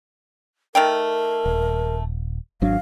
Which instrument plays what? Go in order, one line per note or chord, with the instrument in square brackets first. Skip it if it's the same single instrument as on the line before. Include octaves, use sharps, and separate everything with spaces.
[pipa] D#3 A3 G5 [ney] A#4
[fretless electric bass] D#1
[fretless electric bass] G#1 F#3 D4 [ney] F5